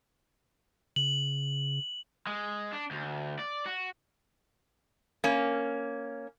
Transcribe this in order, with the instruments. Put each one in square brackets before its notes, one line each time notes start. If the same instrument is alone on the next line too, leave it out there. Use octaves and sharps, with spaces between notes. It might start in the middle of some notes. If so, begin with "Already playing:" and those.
[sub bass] C#3 [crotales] F#7
[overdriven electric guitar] G#3
D4
D2
D5
F#4
[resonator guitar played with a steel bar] A#3 C#4